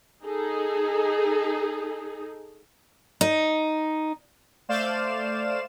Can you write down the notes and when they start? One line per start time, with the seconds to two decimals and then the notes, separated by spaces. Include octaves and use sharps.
0.25 D#4 G#4 A4
3.21 D#4
4.69 A3 C5 D5 F5 E7